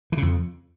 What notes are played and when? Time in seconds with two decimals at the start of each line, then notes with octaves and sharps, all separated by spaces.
0.12 E3
0.17 C#3
0.23 F2